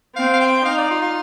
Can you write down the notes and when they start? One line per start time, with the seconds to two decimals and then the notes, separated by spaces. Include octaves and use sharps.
0.16 C4 F5
0.33 F5
0.40 G5
0.65 D#4 F5
0.78 D5
0.91 F4
1.02 F4